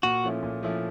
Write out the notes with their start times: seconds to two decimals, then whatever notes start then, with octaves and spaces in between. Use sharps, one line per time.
0.03 A#2 F#4
0.24 F3 A3 C#4 E4
0.42 A#2
0.63 F3 A3 C#4 E4